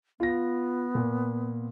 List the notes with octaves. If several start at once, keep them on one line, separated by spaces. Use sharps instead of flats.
B3 F4 A#6
A#2